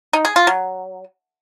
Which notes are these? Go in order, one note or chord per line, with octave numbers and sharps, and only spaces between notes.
D#4
G#4
F4
F#3